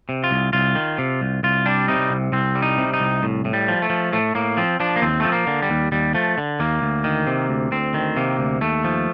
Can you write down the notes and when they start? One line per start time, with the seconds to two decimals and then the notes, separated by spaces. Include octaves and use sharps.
0.09 C3
0.24 F4
0.31 C2
0.53 C2 F4
0.75 D#3
0.98 C3
1.21 C2
1.43 C2 F4
1.66 G3 D4
1.88 C3 D#4
2.10 C2
2.33 C2 C4
2.55 G3
2.62 D#4
2.78 C3
2.94 D#4
3.00 C2
3.23 A2
3.45 A2
3.53 G3
3.68 F3
3.82 A3
3.90 F3
4.13 A2 A3
4.35 A2 A#3
4.57 F3 C4
4.80 F3 D4
4.96 A#3
5.02 D#2 C4
5.20 F3 A3
5.32 A#3
5.47 D3
5.62 G3
5.70 D#2
5.92 D#2 G3
6.15 F3 A3
6.38 D3
6.60 D#2 A#3
6.82 D2
7.04 D#3
7.27 C3
7.49 D2
7.72 D2 C4
7.94 D#3
8.17 C3 A#3
8.39 D2
8.61 D#2 A3
8.84 F3